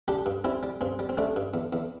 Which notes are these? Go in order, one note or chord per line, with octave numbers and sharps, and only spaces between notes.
G3 D4 G4
G2
G3 C4 E4
G3
G2 C4
G3
C4
G3 A3 D4
G2
E2
E2